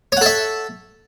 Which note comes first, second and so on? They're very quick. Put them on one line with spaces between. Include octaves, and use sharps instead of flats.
C#5 F#5 A4 E5